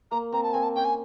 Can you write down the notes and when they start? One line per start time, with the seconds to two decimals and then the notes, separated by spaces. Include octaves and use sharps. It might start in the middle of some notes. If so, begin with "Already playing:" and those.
0.11 A#3 A#5
0.32 C4 A#5
0.43 A5
0.53 C4 G#5
0.63 A5
0.75 C#4 G5
0.85 G#5